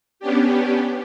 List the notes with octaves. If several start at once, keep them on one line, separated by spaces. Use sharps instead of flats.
B3 C#4 D4 G4